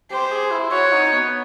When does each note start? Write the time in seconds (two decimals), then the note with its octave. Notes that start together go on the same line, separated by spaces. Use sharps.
0.11 G4 C5
0.31 G#4
0.51 E4
0.71 F#4 C#5
0.92 D#4
1.13 B3